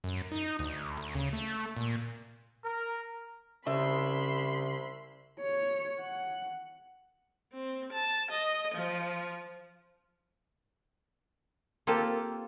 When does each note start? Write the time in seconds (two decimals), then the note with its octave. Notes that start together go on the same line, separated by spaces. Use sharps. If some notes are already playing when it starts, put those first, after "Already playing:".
0.04 F#2
0.32 D#4
0.59 D2
0.97 D2
1.15 C#3
1.33 A3
1.77 A#2
2.64 A#4
3.67 C2 C#3 E5 B5 C6
5.41 C#5
6.00 F#5
7.55 C4
7.93 A5
8.30 D#5
8.74 F3
11.87 A#3 C4 F4 G4 A4